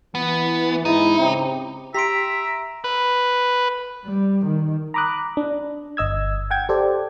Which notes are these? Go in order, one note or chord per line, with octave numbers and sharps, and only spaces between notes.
E3 B3
G#2 G#3 D#4 E4
C#3 C4 G4
G4 E5 A#5 C6 B6 D7
B4
G3
D#3
A#5 B5 D6 D#6 F#6
D4
G1 D#5 E6 G#6
F#5 G5 G#6
G4 A4 C5 D5